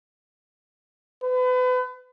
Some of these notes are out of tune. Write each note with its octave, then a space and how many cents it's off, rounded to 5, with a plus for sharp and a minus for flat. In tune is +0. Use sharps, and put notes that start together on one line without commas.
B4 +35